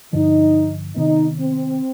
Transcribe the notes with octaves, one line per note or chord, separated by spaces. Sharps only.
G2 D3 F3 D#4
C3 D#3 B3 D#4
C4